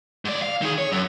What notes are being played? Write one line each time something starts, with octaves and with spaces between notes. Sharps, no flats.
G#2 D5
F5
D#3 G#4
C#5
F#2